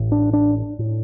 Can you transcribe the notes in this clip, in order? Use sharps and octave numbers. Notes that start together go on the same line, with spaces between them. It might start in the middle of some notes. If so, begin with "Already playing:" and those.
Already playing: A1 A2
D4
D4
A2